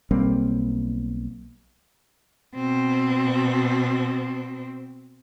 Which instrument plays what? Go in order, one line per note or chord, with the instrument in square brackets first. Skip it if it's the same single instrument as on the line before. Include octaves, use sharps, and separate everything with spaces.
[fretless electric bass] B1 G3 A#3 C4
[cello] B2 C4